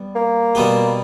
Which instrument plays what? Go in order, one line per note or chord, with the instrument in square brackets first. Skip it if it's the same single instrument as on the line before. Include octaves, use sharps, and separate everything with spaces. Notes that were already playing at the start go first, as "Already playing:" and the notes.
Already playing: [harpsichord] G3 B3
[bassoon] A#3
[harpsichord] B2 G3 B3 G4